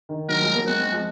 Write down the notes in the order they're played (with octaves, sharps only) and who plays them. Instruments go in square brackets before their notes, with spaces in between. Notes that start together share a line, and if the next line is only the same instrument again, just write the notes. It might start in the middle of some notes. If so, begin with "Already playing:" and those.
[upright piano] D#3
[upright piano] D#3 F#3 [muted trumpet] A#4
[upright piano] F3 G#3
F#3 A#3
[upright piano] G#3 C4 [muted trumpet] F#4
[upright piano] G#3 C4
F3 G#3